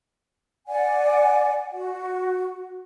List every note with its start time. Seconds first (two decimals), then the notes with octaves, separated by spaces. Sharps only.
0.67 D5 F#5 G#5
1.72 F#4